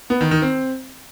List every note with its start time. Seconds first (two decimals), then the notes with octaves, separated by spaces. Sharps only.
0.10 B3
0.21 D#3
0.31 D#3
0.42 C4